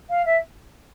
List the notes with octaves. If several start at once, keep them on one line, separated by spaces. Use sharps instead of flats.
F5
E5